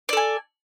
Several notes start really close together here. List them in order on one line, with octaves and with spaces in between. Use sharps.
D5 A4 G#5